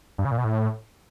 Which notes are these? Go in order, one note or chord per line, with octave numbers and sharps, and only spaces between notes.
G2
C#3
A#2
B2
A2